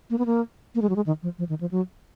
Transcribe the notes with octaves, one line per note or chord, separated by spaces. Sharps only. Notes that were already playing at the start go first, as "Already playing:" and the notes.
A#3
B3
A#3
A#3
G#3
F#3
G#3
D#3
F3
F3
D#3
F3
F#3